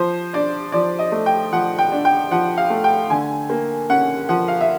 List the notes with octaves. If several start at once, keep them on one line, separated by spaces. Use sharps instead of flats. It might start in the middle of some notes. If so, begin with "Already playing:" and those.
Already playing: F3 C5
D4 D5
F3 D5
D#5
A3
G5
F3 F#5
G5
D4
G5
F3 F#5
F5
A3
G5
D3 G#5
A#3
C#4 F#5
F3 F#5
F5
E5